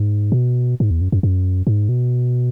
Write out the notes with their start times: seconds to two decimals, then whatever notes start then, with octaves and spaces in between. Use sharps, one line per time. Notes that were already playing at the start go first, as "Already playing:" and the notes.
Already playing: G#2
0.32 A2
0.36 B2
0.80 G#2
0.91 E2
1.01 F#2
1.12 F#2
1.23 F#2
1.67 G#2
1.89 B2